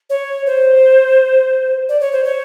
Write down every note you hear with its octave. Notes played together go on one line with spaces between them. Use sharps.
C#5
C5
D5
C#5
C5
C#5